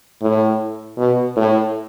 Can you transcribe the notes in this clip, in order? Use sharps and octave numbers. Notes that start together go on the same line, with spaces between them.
A2
B2
A2